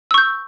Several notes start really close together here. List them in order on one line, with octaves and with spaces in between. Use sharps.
E6 C#6 G6